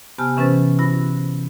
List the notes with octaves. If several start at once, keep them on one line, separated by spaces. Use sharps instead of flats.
C3 B3 G4 G#5 A5 F6
C3 E3 C#4 B4 C5 A6
E4 F#4 B5 A#6